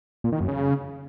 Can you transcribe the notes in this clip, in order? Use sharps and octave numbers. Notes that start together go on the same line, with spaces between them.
A#2
D#3
F#2
C#3